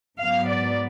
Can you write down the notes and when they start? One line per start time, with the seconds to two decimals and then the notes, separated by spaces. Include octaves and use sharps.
0.20 G#2 F#3 B3 F5
0.49 D5